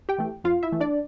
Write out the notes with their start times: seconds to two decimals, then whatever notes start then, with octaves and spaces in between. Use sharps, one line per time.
0.09 G4 G5
0.18 E3 A3
0.44 F2 F4 F5
0.63 E4 E5
0.72 E3 A3
0.80 D4 D5